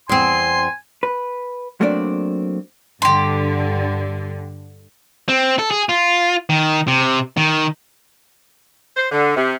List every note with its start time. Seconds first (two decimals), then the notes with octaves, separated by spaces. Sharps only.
0.09 E2 C4 G#5 C6
1.03 B4
1.81 F#3 A3 A#3 C4 D4 D5
3.02 G2 D3 G4 C6
5.29 C4
5.59 A4
5.71 G#4
5.89 F4
6.50 D#3
6.88 C3
7.37 D#3
8.96 C5
9.12 D3
9.36 C3